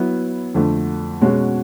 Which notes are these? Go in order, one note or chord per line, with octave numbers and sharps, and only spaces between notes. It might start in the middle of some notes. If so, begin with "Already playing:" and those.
Already playing: F#3 B3 E4
F2 D3 F3 A3
B2 G#3 C#4 F#4